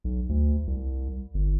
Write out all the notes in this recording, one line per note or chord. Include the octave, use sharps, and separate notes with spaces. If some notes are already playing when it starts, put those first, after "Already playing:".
B1
D2
C2
G1